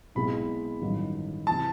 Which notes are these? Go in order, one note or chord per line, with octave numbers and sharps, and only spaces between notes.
B1 B2 G#3 C4 E4 B5
A1 G2 D#3 F#3
C3 E3 A5